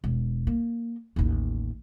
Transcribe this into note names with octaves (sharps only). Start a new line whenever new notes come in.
E1
A#3
A1 D#2